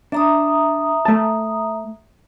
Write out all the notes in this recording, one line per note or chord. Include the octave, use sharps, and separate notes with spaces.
D4 E5 A#5 D#6
A3 A5